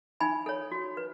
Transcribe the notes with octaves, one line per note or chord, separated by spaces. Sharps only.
D#4 G#5 B5
A4 C#5
F#4
B4